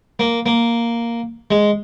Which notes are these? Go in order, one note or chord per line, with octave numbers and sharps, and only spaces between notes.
A#3
A#3
G#3